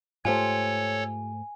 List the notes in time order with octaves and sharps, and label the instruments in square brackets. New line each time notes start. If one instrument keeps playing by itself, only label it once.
[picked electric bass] G#2 A3 [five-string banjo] F4 G4 C5 [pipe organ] A4 C#5 [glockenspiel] G#5